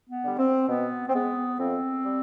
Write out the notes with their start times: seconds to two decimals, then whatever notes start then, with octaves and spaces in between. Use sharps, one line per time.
0.08 B3
0.23 D3 G3
0.38 C4
0.68 B2 B3
1.08 C4
1.14 G#3 B3
1.59 F2 C4
2.04 G3